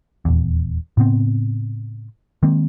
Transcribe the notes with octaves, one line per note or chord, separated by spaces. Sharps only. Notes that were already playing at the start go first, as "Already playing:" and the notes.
D#1 E2
A2 C#3 B3 C4
D#3 G#3 A#3 C4